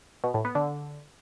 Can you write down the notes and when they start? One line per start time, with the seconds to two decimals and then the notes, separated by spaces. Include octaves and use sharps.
0.24 B2
0.34 A2
0.45 B3
0.55 D3